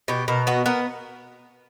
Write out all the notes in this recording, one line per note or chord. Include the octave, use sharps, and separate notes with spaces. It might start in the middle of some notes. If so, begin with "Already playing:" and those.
B2 G4
B2 A#4
B3 F#4
B3 A#4